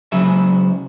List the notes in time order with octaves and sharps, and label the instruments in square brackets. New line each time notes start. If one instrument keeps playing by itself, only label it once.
[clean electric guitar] C#3 F#3 G#3 E5